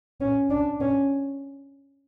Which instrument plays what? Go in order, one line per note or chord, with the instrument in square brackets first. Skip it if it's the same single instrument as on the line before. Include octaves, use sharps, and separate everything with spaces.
[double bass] C#4
D4
C#4